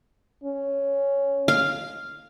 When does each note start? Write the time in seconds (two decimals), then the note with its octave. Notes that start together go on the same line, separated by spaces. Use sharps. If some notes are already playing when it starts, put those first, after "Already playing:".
0.44 C#4
1.48 F5